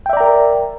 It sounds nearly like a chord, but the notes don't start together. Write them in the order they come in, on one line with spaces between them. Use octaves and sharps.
G5 E5 D5 A#5 A#4